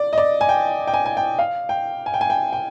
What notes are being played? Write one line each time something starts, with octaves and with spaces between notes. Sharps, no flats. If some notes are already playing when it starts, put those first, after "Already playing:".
Already playing: D5
D#5
D5
G#5
G5
G5
G#5
G#5
G5
F5
G5
G#5
G5
G#5
G5
G5